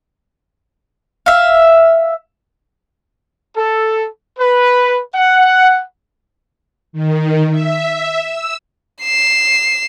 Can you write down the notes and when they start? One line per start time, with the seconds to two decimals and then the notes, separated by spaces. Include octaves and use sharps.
1.26 E5 F5
3.57 A4
4.38 B4
5.15 F#5
6.93 D#3
7.50 E5
8.19 E6
9.02 C7 E7